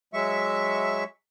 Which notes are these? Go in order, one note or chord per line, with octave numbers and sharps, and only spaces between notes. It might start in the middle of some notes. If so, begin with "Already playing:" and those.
F#3 G#3 E5 C#6